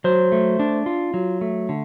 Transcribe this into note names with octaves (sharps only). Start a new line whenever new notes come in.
F#3 C5
A3
D4
F4
F#3
A3
D3